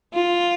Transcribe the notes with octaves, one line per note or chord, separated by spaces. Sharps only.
F4